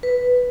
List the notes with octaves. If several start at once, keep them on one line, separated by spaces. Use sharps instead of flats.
B4